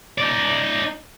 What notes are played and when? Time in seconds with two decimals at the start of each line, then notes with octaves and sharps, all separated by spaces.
0.18 D#4 D5